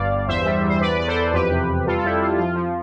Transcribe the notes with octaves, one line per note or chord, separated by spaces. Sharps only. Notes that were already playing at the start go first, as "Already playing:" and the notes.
Already playing: G1 G2 D5 F5
G2
E2 C5 E5
G3
E2
C5
E2 B4 D5
E2 D5
A4 C5
E2
F2 G4 B4
C3
C3
G3 F4 A4
A4
F2 E4 G4
F2 F4
F3 F4
F3